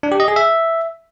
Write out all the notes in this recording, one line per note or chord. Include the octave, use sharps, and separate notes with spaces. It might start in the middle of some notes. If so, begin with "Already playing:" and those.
D4
G4
D#5
G#4
E5